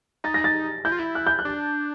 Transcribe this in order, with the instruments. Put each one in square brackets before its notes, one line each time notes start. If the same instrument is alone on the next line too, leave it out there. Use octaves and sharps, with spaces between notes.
[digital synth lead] D#4 [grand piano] A6
[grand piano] A#6
A6
[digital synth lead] E4 [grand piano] G6
[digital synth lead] F4
E4
[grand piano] F#6
G6
F#6
[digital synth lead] D4